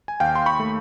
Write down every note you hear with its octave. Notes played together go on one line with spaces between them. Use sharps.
G#5
D#2 F5 G5
C6
B5 C#6
A3